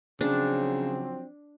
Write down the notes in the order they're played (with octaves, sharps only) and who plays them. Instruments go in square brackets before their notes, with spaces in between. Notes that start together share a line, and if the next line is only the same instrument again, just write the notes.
[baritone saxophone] C#3 [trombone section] F3 F#3 C4 [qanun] D4